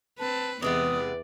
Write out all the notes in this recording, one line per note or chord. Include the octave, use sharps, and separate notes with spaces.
C4 B4 A5
E2 C3 G#3 B3 B4 D5 D#6